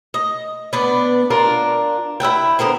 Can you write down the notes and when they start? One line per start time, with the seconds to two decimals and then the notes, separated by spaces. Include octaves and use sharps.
0.14 D#5
0.73 B3 D4
1.30 D4 F4 A#4
2.20 E4 E5 F#5 G5
2.59 D3 B3 A#4 C5